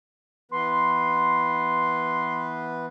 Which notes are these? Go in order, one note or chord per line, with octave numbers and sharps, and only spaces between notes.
E3 B3 B4 C6